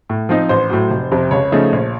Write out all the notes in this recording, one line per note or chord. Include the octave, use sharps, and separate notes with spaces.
A2
F3 C4 D#4
A1 C5
A2 F#3
F1
F2 C3
C#2 C#5
C#3 F3 A3 D#4
A#1